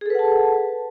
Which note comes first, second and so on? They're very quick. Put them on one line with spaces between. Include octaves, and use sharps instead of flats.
G#4 A4 B4 F#5 A5